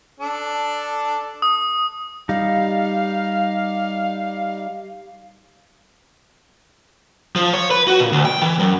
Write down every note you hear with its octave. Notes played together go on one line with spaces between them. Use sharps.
D4 A4
D#6
G3 D#4 F5
F3
C#5
B4
F#4
A#2
D2
G5
E3
F#2